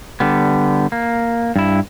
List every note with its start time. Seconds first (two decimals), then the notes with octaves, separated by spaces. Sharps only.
0.20 D3 G3 B3
0.92 A#3
1.56 G2 E4